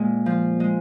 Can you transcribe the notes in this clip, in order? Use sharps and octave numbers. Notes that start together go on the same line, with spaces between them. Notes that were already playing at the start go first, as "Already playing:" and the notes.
Already playing: A#2 G#3 C4
F3
G#3